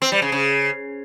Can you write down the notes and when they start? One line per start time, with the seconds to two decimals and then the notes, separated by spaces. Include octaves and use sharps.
0.02 C4
0.12 G3
0.22 C#3
0.32 C#3